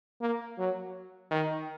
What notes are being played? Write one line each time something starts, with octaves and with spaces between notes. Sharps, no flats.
A#3
F#3
D#3